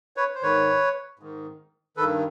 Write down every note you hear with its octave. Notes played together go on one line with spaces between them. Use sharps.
B4 C#5
C5
G#2 D#3 B4 C#5
G#2 D#3
G2 D#3 A4 B4